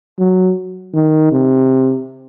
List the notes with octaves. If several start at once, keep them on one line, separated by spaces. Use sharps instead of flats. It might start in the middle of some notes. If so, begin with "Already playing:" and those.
F#3
D#3
C3